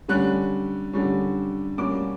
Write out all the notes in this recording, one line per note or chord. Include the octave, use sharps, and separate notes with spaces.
D3 G3 C#4 F#6
D3 G3 C#4
B2 G3 A#3 C#4 D6